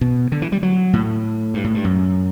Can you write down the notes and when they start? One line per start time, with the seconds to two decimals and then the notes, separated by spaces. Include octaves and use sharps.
0.01 B2
0.32 D3
0.42 E3
0.52 G3
0.63 F#3
0.93 A2
1.54 G2
1.64 A2
1.74 G2
1.84 F#2